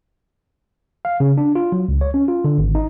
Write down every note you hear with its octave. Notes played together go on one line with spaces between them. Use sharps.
F5
C#3
D4
F4
F#3
C#2
C#5
C#4
F4
D3
G#1
D#4